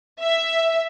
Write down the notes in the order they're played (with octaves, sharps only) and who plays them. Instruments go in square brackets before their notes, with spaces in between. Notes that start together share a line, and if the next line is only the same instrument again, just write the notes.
[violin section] E5